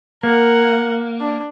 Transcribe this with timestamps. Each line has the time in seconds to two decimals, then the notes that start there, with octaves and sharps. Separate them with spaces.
0.23 A#3 A#4 F#5
1.20 D4